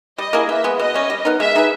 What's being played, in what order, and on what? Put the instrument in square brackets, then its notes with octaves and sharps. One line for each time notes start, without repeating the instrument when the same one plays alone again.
[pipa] G3 [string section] D#5
[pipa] A#3 E4 G#4
[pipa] E3 [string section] E5
[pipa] G#3 B3
[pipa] B2 [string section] D#5
[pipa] G3 C#4
G3
B3 D#4 A#4
[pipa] G#3 [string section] E5
[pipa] D#4 G#4 B4